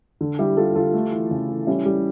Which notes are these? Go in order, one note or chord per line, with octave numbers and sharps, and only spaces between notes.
D3
G3 E4 G4
G3 F4 A4
D3 F4 A4
A3
E3
C#3
E3
G3 C#4 E4
G3